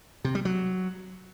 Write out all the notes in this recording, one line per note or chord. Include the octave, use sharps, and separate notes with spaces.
C3
G3
F#3